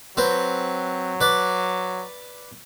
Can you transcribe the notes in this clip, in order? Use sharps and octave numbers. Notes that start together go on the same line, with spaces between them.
F#3 C4 B4
B4 D5